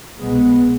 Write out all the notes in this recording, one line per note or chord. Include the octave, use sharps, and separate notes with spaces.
C2 B2 G#3 B3